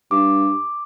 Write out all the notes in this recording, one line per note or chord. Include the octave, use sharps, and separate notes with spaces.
G2 D6